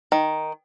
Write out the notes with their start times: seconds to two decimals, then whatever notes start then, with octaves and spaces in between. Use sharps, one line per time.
0.12 D#3